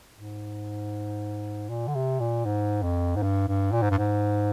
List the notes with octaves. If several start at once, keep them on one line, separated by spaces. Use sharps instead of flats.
G#2
A#2
D3
C3
A#2
G#2
F2
G#2
G2
G2
A#2
G#2
G2
G#2